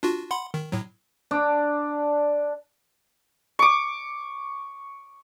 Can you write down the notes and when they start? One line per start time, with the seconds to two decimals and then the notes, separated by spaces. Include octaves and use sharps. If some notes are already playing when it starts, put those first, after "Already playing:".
0.03 D4 F4 F#4
0.31 F#5 B5 C6
0.54 D#3
0.72 A2 F#3
1.31 D4
3.59 C#6 D6